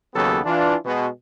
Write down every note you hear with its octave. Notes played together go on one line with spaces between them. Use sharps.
D#2 C#3 F#3 B3 G4 A4
E3 D4 F4
B2 G#3